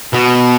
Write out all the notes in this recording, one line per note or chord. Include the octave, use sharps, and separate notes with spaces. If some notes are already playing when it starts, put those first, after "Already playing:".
B2